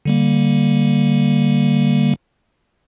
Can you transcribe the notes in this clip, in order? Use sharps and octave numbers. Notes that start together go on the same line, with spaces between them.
D3 G3 A#3